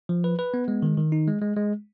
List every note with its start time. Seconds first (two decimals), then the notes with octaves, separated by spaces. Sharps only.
0.09 F3
0.24 B4
0.39 B4
0.54 B3
0.68 G#3
0.82 D#3
0.97 D#3
1.12 D#4
1.27 G#3
1.42 G#3
1.56 G#3